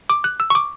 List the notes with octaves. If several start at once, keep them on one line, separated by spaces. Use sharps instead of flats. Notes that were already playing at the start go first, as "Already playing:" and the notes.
D6
F#6
E6
C#6
D6